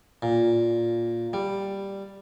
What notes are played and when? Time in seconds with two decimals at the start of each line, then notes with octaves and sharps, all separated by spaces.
0.22 A#2
1.33 G3